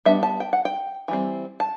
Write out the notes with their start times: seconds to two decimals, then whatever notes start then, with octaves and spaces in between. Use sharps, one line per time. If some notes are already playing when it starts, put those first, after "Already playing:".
0.05 G3 B3 D4 E5
0.23 A5
0.40 G5
0.53 F#5
0.65 G5
1.08 E3 G3 C4
1.60 A5